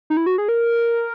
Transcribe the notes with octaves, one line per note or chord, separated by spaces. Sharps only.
D#4
E4
F#4
G#4
A#4